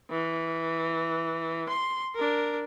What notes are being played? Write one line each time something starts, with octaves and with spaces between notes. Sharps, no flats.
E3
C6
D4 A#4